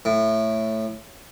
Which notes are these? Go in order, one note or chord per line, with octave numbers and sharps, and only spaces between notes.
A2